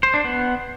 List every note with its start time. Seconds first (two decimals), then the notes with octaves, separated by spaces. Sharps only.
0.03 C5
0.14 D4
0.24 B3